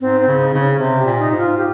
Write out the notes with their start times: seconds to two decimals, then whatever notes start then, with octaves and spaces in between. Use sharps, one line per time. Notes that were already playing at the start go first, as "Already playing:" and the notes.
0.01 G#2 C4
0.21 C4
0.27 C#3
0.40 D#4
0.53 C#3 C4
0.60 C#4
0.79 C3 C4
0.99 G4
1.05 A#2
1.19 D#4
1.32 G#2
1.38 F4
1.58 G4